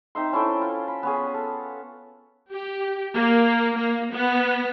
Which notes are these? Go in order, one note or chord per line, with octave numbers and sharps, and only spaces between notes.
C4 D#4 E5 C6
C#4 E4 A4 G5
F4
B5
B3 C#4 G#4
A4
G4
A#3
A#3
B3